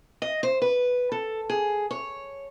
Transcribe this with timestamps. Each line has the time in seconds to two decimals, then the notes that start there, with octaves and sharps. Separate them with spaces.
0.22 D#5
0.43 C5
0.62 B4
1.12 A4
1.50 G#4
1.91 C#5